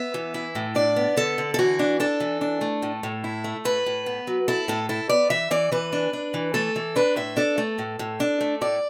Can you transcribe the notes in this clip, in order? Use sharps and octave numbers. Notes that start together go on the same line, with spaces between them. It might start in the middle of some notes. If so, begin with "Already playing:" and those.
Already playing: B3 E5
E3
E4
A2
D4 D5
B3
D3 A4
D3
A4
E3 F#4
D4
D4 A4
E3
D4
A3
A2
A2
E4
A3
A2 B4
A2
B3
F#3
E4 A4
A2 A4
E4 A4
B3 D5
E3 E5
E3 D5
E3 B4
D4
D4
E3
A3 A4
E3
D4 B4
A2 E5
D4 A4
A3
A2
A2
D4
A3
A2 D5